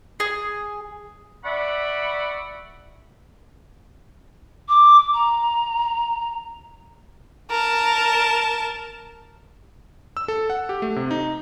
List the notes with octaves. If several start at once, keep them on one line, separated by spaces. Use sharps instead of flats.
G#4
D5 E5 F#5 B5 C#6
D6
A#5
A#4 A5
E6
A4
F#5
G4
A3
C3
D#4